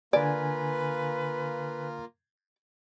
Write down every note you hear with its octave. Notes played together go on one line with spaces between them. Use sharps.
D3 A#3 F4 B4 D5 G#5